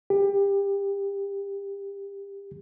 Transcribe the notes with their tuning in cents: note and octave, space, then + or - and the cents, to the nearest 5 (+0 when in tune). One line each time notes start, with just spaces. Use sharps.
G4 +25